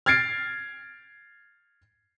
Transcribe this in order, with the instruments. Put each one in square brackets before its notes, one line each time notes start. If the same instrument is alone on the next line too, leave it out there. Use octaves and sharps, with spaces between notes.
[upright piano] F6 G#6 A6 C7 D7